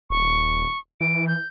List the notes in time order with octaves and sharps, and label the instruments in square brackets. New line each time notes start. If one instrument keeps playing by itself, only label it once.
[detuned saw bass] D#1 [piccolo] C#6
[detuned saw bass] E3 [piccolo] D7
[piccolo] G6